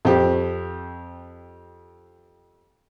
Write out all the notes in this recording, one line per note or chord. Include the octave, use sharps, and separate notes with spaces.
F2 C4 G4